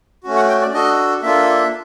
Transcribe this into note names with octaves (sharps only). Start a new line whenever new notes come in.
A3 C#4 F#4
F#5
G5
D5
D4 F#4 A4 D#5
A#3 D4 F4 A4 E5